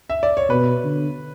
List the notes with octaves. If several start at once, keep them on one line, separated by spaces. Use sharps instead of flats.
E5
D5
C#5
B2 B4
D3